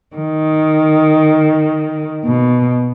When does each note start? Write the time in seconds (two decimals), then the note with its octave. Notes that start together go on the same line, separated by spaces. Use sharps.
0.18 D#3
2.24 B2